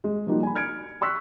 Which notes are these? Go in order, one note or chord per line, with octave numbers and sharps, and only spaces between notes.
G#3
F3 G3 A#3 D#4 F#4
G#5 B5
F6 G#6 C#7 D7
C6 C#6 E6 F#6 B6